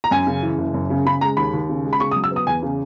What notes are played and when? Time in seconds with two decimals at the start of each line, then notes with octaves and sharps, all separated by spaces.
0.04 A#5
0.11 F#2 G#5
0.27 C#3
0.43 E3
0.58 F#1
0.74 F#2
0.90 C#3
1.05 C#3 B5
1.21 G#3 A#5
1.37 D#2 B5
1.53 D#2
1.69 C#3
1.84 G#3
1.93 B5
2.00 C#3 C#6
2.11 D#6
2.16 F#3
2.24 E6
2.31 B3
2.36 D#6
2.47 E2 G#5
2.63 C#3